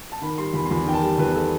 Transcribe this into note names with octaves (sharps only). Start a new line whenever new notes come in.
A5
D#3 B5
G3 C6
E2 B5
C6
E2 B5
D#3 G5
A5
G3
E2 B4
A4